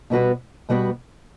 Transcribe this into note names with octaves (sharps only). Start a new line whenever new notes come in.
B2 G3 B3 F#4 B4
B2 G3 B3 F#4 B4